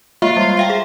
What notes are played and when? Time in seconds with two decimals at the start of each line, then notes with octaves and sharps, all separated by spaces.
0.22 G#3 A#3 F4 E5
0.36 G3 C6
0.57 E5 F5 G5
0.70 G#4